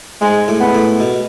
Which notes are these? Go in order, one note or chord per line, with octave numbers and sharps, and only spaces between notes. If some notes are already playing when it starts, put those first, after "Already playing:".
G#2 G#3
A2
B3
A2
B2